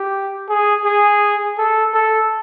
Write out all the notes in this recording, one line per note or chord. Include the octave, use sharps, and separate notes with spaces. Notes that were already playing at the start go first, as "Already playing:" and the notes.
Already playing: G4
G#4
G#4
A4
A4